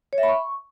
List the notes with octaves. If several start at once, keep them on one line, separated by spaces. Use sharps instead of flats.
C#5
E5
B5
C#6